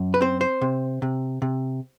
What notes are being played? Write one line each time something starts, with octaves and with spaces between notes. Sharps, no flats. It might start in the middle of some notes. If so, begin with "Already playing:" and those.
Already playing: F#2
B4
C4 C5
C5
C3
C3
C3